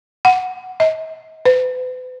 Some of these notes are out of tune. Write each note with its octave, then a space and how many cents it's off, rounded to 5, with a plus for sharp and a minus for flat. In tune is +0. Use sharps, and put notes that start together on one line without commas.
F#5 -5
D#5 +40
B4 +45